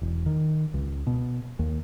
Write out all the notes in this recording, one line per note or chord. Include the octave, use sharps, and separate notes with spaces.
E1
D#3
C#2
B2
D#2